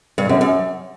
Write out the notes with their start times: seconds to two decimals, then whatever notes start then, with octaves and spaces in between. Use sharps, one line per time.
0.18 G2
0.29 F#2
0.41 F#2